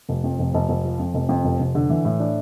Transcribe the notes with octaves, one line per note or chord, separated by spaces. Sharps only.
F1
F2
F1
F1
F1
F3
F2
F1
F2
F1
F1
D3
E3
A2
D4